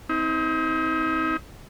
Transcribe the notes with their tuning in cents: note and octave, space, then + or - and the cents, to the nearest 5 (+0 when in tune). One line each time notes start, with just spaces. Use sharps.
C4 -15 D#4 +40